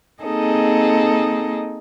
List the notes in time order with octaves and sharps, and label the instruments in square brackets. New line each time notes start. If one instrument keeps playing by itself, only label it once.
[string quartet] A#3 C4 D#4 G#4 A4 D#5